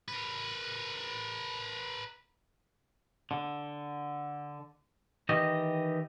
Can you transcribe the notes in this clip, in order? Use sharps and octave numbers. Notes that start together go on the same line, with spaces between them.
A#4 B4
D3
D#3 E3 G4 D#5